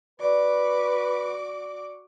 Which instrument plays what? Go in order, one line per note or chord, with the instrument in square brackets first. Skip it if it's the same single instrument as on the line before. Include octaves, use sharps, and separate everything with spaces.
[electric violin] F#4 D6 [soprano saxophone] B4 [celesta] D5